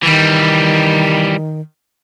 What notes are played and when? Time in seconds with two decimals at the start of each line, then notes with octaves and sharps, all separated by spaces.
0.03 D#3 E3 G3